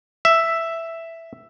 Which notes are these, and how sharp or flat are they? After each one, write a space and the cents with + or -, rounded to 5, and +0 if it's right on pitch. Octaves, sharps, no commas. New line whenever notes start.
E5 +5